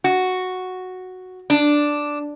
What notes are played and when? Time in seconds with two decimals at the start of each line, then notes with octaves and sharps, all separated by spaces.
0.04 F#4
1.50 D4